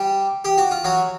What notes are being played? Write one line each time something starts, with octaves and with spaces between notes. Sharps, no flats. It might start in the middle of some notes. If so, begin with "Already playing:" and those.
Already playing: G3 G4
G4
F#4
F4
F#3 F#4